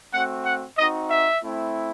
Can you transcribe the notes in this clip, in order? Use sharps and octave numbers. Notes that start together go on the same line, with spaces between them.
A3 C4 F#4 F#5
F#5
C4 D#4 F#4 D#5
E5
A3 C4 E4